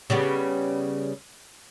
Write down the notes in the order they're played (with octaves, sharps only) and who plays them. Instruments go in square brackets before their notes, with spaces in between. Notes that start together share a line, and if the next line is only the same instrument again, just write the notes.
[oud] C#3 G3 B3